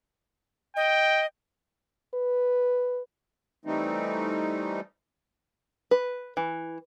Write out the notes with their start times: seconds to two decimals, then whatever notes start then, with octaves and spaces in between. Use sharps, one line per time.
0.76 D#5 G5
2.14 B4
3.65 E3 G3 A3 C4 D#4
5.91 B4
6.37 E3